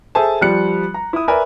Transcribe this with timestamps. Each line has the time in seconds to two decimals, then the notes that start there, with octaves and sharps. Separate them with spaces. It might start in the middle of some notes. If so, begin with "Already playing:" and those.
0.15 G#4 A4 C5 E5 G#5 A5
0.41 F3 G3 F#6 C#7
0.94 A#5
1.13 E4 D#6
1.28 A#4 B4 D5 E5 G#5